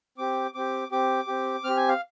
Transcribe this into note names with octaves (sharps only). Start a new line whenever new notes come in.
C4 G4 D6
C4 G4 D6
C4 G4 D6
C4 G4
C4 G4 F6
G#5
F5